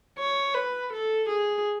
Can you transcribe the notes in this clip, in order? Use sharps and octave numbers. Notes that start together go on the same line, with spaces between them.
C#5
B4
A4
G#4